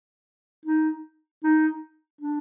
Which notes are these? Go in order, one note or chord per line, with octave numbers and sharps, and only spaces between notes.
D#4
D#4
D4